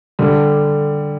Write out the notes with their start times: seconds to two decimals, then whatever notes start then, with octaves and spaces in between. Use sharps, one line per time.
0.19 D3 G3